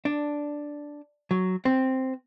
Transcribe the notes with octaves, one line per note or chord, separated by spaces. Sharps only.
D4
F#3
C4